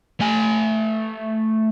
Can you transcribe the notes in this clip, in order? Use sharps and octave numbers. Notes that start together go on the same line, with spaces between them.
A3 G#5